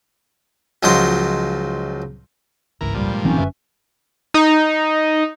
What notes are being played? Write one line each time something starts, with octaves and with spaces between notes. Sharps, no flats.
C#2 F3 F#3 D#4 C6
G1 C#2 G#2 E3 A#4
G2 A#2 F3 G3
G#3
G#1 E3 F#3 C4 C#4 D#4
G1 F#2 D3 B4 E5
D#4